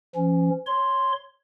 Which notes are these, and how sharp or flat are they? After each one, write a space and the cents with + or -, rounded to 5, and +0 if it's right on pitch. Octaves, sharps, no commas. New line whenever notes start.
F3 -40 C#4 +0
C#5 +0 C6 +0